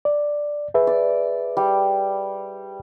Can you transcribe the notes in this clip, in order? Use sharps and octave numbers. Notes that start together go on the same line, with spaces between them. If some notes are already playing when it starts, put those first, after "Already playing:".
D5
G#4 B4 E5
D5
G3